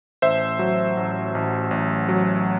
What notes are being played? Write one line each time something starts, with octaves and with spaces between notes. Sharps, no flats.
A1 C5 E5
F#3
A1
A1
A1
F#3